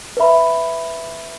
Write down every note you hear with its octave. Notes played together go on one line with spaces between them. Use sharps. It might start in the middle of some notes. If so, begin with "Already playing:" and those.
B4 E5 B5